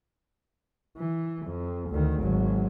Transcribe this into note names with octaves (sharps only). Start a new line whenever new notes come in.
E3
F2
D2 D#3
G#1 F#3